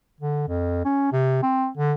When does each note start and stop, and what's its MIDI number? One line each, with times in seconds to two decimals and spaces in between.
0.21 0.48 50
0.48 0.82 41
0.85 1.09 61
1.12 1.42 48
1.43 1.68 60
1.77 1.93 50